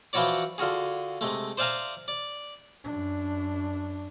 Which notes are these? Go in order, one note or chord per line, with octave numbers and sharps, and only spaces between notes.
E3 F3 E4 F#4 C#5 D5
D3 F4 F#4 G#4
C3 G#3 A3
C5 D5 E5 F5 G#5 A#5
D5
F#2 D4